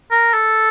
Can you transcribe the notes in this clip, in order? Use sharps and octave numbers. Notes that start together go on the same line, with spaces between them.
A#4
A4